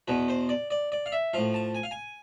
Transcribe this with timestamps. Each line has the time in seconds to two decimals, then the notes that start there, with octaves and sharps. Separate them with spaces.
0.08 E2 B2 B4
0.28 C5
0.49 D5
0.71 D5
0.92 D5
1.06 F5
1.12 E5
1.34 A2 F3 F5
1.54 A5
1.75 G#5
1.83 F5
1.91 G#5